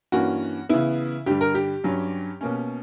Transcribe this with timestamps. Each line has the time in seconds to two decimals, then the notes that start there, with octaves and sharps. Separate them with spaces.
0.12 G2 E3 A#3 C#4 F#4
0.69 C#3 E3 B3 E4
1.26 G2 D3 G3 G4
1.41 A#4
1.55 G4
1.84 G2 F#3 C#4
2.41 B2 A#3 C#4